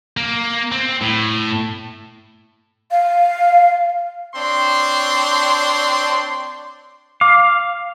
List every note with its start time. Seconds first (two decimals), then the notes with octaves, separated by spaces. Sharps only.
0.17 A#3
0.72 C4
1.01 A2
2.91 F5
4.35 C4 D4 C#5 C6
7.21 F5 D6